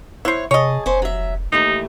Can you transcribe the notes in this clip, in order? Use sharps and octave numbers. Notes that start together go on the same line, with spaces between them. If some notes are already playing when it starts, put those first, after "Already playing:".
E4 C5 C#5 F#5
C3 G#4 C#5 D#5 A5
F1 C#4 C5
F#3 E5
D#2 E3 A3 D#4